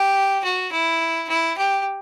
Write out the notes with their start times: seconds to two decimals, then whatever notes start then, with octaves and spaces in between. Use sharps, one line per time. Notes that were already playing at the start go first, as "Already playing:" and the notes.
Already playing: G4
0.44 F#4
0.72 E4
1.29 E4
1.57 G4